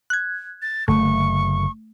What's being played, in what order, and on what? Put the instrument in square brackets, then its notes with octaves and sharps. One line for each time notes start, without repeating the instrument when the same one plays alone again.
[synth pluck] F#6 G#6
[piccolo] A6
[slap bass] F#1 D3 [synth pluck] A3 [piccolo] C#6